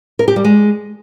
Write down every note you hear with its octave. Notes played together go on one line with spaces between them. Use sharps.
A#4
G4
G3
G#3